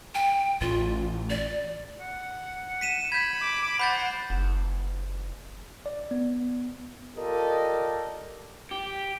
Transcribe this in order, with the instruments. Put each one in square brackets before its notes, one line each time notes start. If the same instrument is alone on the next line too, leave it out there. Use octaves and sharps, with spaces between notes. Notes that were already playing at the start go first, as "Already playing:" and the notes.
[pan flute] G5
[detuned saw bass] A1 [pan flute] F4
[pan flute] D5
[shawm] F#5
[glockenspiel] B6 D#7 E7
[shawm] B5 [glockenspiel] G6 G#6
[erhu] D6
[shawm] C5 [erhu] F#5 [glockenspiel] B5 G6 A6
[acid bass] F#1
[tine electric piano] D5
B3
[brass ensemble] F4 G4 A4 A#4 D5 D#5
[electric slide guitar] G4